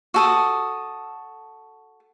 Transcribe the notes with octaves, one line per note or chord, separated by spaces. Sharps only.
F#4 A4 D#6